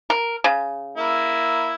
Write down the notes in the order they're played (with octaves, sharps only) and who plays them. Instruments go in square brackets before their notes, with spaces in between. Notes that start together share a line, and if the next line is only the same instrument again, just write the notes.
[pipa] A#4
C#3
[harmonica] A#3 E4